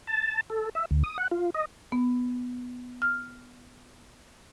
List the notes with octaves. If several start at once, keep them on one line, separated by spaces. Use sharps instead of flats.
A5
A4
E5
D2
D#6
F#5
F4
D#5
B3
F6